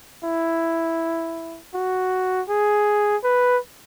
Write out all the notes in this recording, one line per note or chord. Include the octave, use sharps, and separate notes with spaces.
E4
F#4
G#4
B4